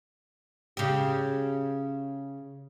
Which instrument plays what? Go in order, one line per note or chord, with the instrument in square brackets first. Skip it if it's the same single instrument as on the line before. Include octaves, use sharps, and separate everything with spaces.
[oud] C#3 G4